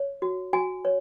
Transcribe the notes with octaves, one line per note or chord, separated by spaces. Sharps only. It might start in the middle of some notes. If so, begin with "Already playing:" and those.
Already playing: C#5
F#4
F#4 G#5
C#5